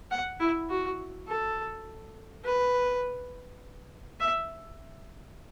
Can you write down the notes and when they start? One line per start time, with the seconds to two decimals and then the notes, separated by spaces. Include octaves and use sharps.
0.11 F#5
0.40 E4
0.69 F#4
1.27 A4
2.45 B4
4.20 E5